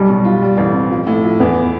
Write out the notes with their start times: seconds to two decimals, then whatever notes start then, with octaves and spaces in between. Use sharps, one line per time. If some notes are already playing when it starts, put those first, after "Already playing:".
Already playing: B1 G3
0.09 B2
0.25 F4
0.42 G3
0.57 A1
0.74 C4
0.90 F3
1.07 A2
1.23 F3
1.40 E2 B3